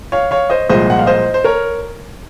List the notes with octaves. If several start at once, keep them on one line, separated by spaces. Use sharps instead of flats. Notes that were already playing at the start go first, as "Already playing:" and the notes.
C#5 F5
C#5 F5
C5 D#5
C2 A#2 F3 G#3 C5 D#5
F#5
F5
C5 D#5
C5
A#4 C#5